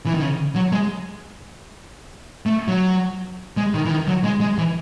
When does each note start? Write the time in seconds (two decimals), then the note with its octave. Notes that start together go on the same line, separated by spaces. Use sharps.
0.06 E3
0.14 D#3
0.22 C#3
0.55 F#3
0.72 G#3
2.46 A3
2.68 F#3
3.57 G#3
3.74 D#3
3.85 E3
3.90 D#3
4.08 F#3
4.24 G#3
4.41 G#3
4.58 E3